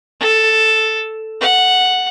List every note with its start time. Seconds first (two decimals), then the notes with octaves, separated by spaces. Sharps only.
0.20 A4
1.41 F#5